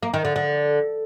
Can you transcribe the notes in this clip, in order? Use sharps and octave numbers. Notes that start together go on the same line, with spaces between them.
A#3
D#3
D3
D3